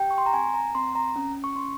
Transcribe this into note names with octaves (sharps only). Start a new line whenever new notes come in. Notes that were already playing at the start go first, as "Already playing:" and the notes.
Already playing: G4 G5
C#6
C6
A#5
C4 G#5
A#5
C4 C6
A#5
C#4
C#6
C#4 C6